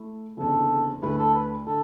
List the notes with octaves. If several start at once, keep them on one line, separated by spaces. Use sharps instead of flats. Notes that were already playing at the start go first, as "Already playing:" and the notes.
Already playing: A3 E4
F#1 E2 D3 A4
D2 D3 A3 E4 B4
A4
B4
D3 A4